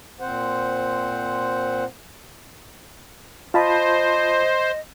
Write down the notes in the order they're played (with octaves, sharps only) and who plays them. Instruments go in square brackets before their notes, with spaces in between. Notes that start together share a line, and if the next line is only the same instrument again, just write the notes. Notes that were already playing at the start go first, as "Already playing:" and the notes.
[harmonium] A#2 C4 C5 F#5
[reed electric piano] F4 A5 B5 [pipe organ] C5 [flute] D#5